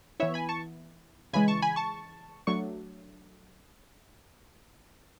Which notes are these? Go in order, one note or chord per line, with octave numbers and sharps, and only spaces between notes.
E3 B3 E4 C#5 E5
G#5 B5
A5 C#6
C#3 E3 G#3 G#5 B5
A5 C#6
G#5 B5
A5 C#6
F#3 A3 D4 C#6